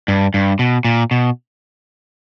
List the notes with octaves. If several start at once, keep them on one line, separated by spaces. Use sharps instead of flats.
G2
G2
B2
A#2
B2